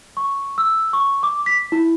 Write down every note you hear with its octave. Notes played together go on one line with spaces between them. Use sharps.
C#6
E6
C#6
D6
B6
E4